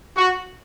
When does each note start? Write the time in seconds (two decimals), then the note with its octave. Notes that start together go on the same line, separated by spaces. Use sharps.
0.16 F#4